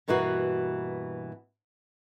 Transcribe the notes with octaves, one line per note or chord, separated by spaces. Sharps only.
G2 B2 E3 A#3 F#4